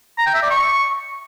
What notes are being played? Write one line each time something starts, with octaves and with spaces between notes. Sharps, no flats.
A#5
G5
E5
D5
C#6